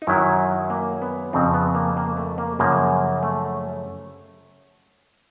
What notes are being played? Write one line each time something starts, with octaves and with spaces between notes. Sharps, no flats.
D#4
F#2 D#3 F#3 E4
A#3
B3
F2 C#3 F3 C4
B3
A#3
A#3
A3
A#3
F#2 C#3 F3 A#3
A3